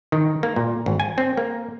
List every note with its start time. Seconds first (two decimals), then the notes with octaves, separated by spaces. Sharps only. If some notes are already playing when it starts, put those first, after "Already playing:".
0.12 D#3
0.43 A#3
0.56 A#2
0.86 G#1
1.00 G#5
1.18 C4
1.37 A#3